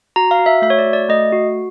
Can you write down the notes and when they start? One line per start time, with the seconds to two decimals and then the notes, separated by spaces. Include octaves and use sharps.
0.16 F#4 A#5
0.31 F5
0.39 F#4
0.46 E5
0.62 A3 E5
0.70 C#5
0.78 D5
0.85 F#4
0.93 D5
1.09 A3 D#5
1.32 F#4